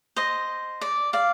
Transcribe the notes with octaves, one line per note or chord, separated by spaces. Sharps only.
C5 D#5
D5
D5 F5